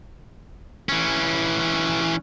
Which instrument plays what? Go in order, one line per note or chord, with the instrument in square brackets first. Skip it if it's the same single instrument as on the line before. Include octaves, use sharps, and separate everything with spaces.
[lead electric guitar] E3 C#4